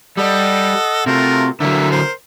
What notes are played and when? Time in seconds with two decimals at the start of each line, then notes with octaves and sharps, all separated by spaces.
0.18 G3 A4 D#5 F#5
1.06 C3 A3 F4 F#4 A#4
1.60 D3 F#3 A#4 E5
1.92 C5